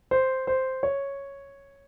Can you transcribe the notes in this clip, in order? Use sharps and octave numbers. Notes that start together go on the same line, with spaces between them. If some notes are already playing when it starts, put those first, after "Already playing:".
C5
C5
C#5